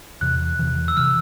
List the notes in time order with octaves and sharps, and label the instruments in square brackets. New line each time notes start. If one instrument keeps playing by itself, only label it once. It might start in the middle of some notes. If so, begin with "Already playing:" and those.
[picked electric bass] E2 C3 E3 [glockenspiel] F#6
[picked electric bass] E2 C3 E3
[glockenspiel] E6
[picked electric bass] C3 E3 [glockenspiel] F6